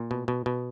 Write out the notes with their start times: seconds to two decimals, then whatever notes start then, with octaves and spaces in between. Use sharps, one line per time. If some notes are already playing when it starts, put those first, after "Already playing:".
Already playing: A#2
0.11 B2
0.28 B2
0.46 B2